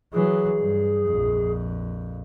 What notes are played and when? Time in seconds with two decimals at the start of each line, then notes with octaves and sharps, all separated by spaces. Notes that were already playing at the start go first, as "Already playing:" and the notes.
0.13 E3 F#3 G#4
0.58 G2
1.06 A#1 F2